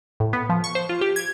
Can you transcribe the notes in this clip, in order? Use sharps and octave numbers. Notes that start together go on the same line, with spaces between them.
A2
B3
F3
C#6
C5
F4
G4
G#6